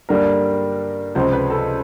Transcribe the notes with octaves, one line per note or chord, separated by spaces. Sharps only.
G2 D3 G3 A#3 D4 A#4
C#2 C3 F3 G#3 C5
B4
A4